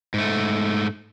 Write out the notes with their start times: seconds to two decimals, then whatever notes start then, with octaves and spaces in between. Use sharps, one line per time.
0.14 G#2 A3